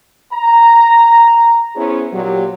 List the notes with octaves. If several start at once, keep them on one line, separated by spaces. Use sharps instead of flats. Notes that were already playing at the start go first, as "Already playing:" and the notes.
A#5
B3 C#4 E4 G#4 C5
A#2 F#3 G4